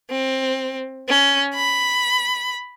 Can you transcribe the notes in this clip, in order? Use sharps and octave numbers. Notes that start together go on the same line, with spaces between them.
C4
C#4
B5